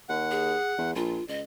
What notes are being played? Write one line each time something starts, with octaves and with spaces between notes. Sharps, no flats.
D#2 F#5
G#4
E2
A#1 F4
C#2 D#5